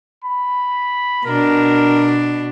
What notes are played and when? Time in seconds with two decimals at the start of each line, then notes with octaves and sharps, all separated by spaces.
0.25 B5
1.26 B2 D4 A#4